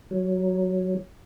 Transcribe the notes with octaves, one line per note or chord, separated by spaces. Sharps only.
F#3